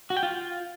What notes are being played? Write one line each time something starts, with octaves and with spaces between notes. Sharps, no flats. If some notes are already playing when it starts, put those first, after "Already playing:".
F#4
G5
F4